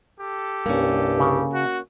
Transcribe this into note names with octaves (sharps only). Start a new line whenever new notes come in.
G4 A4
C2 G2 A#3 C#4
C#3
F#4